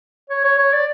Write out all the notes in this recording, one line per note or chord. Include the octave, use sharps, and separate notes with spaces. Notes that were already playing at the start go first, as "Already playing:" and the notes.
C#5
C#5
C#5
D5